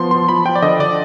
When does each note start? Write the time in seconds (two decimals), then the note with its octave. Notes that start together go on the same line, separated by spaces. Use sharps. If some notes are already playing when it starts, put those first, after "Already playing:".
Already playing: F3 B3 C6
0.11 F3 C6
0.29 F3 B5
0.45 F3 G5
0.55 D5
0.62 D3 D#5
0.79 D3 D5